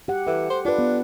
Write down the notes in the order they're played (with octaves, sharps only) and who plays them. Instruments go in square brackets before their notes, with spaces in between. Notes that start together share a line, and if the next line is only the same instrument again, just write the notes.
[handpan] G4 F#5
[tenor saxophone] E3 [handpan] A4
[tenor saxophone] C5
[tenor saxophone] D4 [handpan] F4 B4
[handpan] B3